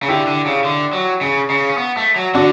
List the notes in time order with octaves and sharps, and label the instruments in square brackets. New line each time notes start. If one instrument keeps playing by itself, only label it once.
[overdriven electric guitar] C#3
[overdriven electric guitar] D3 [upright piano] E4 G4
[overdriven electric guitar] D3
C#3
D3
F#3
C#3
C#3
C#4
B3
A3
F#3
[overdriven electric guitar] D3 [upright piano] D4 F#4